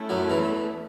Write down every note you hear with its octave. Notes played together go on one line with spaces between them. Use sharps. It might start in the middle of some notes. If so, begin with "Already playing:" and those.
Already playing: A3 C#4 E4 A4 E5
F#2 F#3
E2 E3